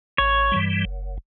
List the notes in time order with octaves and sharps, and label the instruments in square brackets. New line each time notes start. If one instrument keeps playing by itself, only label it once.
[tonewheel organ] A1 [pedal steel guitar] C#5
[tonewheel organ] G2 E3 G3
F#1